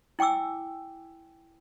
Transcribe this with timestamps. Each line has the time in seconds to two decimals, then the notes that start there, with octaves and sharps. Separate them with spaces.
0.19 E4 G5 G#5 D6 E6